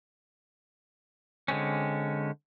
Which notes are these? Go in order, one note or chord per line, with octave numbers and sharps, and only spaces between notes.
D3 G#3 C4 C#4